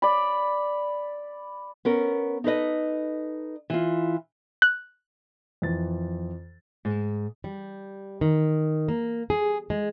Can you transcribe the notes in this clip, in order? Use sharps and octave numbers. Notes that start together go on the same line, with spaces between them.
D5 B5
B3 C#4 A#4
D#4 A4 B4 D#5
E3 F4
F#6
F2 E3 A6
G#2
G3
D#3
A#3
G#4
G#3